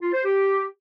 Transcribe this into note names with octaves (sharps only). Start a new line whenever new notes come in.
F4
C5
G4